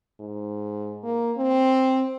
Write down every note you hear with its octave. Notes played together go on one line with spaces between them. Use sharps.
G#2
A#3
C4